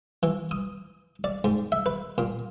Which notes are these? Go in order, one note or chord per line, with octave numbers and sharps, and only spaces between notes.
E3
D#6
D5
G#2
E5
B4
A#2